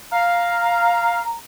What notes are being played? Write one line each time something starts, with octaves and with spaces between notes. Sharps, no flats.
F5 A#5